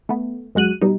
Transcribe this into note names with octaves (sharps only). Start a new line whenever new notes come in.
A3 B3
F#2 G#3 F#4 F#6 D#7
B2 G3 D#4